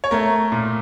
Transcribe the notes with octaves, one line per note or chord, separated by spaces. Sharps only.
C#5
A3 A#4
A#2